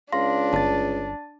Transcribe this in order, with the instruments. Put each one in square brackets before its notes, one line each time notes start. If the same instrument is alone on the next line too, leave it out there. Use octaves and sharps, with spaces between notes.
[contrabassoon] C#2 [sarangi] D4 [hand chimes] F5 C6 A#6
[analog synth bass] G1 [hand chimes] A5 A6